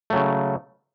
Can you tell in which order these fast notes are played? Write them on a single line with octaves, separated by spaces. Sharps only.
A3 F#3 C#3